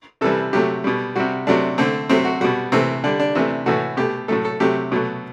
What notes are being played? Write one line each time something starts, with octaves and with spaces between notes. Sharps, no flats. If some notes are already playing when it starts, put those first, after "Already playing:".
C3 E3 G3 A4
C3 F#3 A3 G4
B2 G3
C3 G3 F#4
C3 F#3 A3 D4
D3 A3 C4
C3 F#3 A3 C4
F#4
B2 G3 F#4
C3 E3 A3 C4
D3 G3 D4
D4
C3 E3 A3
A2 E3 A3 F#4
B2 A3 G4
A2 F#3 A3 A4
A4
C3 F#3 A3 G4
B2 F#3 A3